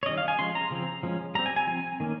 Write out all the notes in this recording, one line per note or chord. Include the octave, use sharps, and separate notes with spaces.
C#5
D#3 G3 C#4 D#5
F5
G#5
F3 G#3 C#4 C6
A#5
C#3 F3 C4
F3 G#3 C#4
G3 C4 A#5
G#5
G#5
F3 C4 G#5
D#3 A#3 C#4